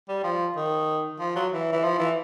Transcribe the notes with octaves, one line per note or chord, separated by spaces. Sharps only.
G3
F3
D#3
F3
F#3
E3
E3
F3
E3